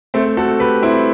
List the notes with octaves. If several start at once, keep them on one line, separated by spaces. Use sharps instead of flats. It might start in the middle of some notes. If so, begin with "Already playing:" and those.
A3 C4
F#4 A4
G4 B4
C4 E4